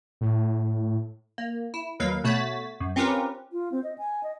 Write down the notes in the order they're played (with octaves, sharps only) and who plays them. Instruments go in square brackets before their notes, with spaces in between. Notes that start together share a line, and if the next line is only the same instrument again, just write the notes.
[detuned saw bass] A2
[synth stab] A#3
E4
D#2 F#3 A#3 B4 F5
B2 A3 F#4 C#5 A6 B6
F#2
C4 C#4 F4 G4 A#4 B4
[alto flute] F4
C4
D#5
G#5
D#5